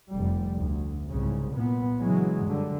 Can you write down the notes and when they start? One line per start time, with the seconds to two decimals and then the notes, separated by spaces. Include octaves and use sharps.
0.11 F1 G3
0.57 D2
1.08 C2 G#2 C#3
1.54 A#2 B3
1.98 C#3 E3 F#3 G#3
2.44 G2 D3